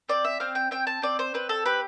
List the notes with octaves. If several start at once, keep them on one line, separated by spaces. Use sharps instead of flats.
C4 D5
E5
C4 F5
G5
C4 G5
A5
C4 D5
C5
C4 B4
A4
G4 B4